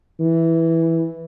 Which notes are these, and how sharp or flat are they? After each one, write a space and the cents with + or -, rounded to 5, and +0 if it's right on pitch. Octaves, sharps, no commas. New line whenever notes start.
E3 -5